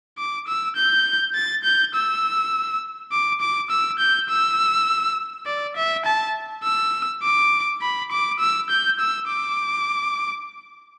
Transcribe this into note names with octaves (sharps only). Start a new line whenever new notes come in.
D6
E6
G6
A6
G6
E6
D6
D6
E6
G6
E6
D5
E5
A5
E6
D6
B5
D6
E6
G6
E6
D6